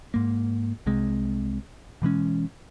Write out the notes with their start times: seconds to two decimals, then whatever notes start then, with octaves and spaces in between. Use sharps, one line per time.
0.14 G#2 A#3
0.86 C2 C3 G#3
2.02 B2 E3 G#3 C#4